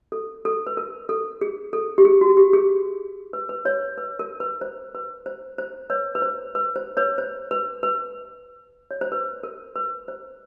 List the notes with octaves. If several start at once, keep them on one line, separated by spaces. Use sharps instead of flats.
A4
A4
B4
A#4
A4
G#4
A4
G4
G#4
F#4
G4
G#4
B4
B4
B4 C#5
B4
A#4
B4
C5
B4
C5
C5
B4 C#5
B4
C5
B4
C5
B4 C#5
C5
B4
B4
C#5
C5
B4
A#4
B4
C5